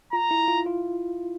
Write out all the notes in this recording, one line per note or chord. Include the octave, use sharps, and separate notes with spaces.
F4 A#5
E4
F4
F4